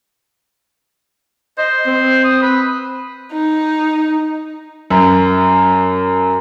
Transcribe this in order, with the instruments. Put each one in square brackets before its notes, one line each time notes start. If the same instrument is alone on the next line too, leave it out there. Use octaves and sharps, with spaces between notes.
[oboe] C5 [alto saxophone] D#5
[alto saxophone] C4
[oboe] D#6
B4
[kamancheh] D#4
[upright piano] F#2